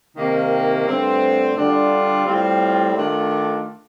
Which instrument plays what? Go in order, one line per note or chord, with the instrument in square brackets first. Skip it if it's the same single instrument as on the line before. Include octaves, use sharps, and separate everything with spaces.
[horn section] C3 D#3 A#3
G2 D3 A3 C4
D3 G3 D4 F4
A2 G3 C4 F4
D#3 A3 D4 F4